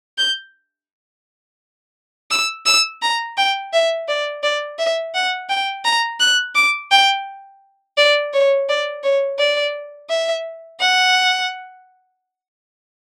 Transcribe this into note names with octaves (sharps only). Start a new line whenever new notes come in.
G6
E6
E6
A#5
G5
E5
D5
D5
E5
F#5
G5
A#5
F#6
D6
G5
D5
C#5
D5
C#5
D5
E5
F#5